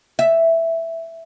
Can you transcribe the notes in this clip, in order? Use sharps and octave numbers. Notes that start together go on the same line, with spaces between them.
E5